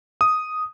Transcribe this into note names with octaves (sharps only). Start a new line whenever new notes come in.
D#6